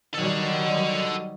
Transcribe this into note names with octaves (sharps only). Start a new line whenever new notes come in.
D#3 F#3 G3 A4 F#5